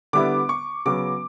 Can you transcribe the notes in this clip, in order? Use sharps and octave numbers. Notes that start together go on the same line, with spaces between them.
D3 G3 B3 E4 D6
C#6
C#3 F#3 B3 D6